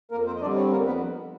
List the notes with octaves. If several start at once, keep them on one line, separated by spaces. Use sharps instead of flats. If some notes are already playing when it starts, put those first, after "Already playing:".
F2 A#3 A#4
C4 C5
D#5
D3 G3 C4 D4 D5
C#4 C#5
F2 A#3 A#4
B3 B4